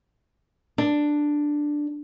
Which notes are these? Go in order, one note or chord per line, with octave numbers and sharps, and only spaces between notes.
D4